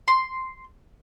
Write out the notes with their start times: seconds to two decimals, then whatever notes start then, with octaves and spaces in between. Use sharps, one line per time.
0.08 C6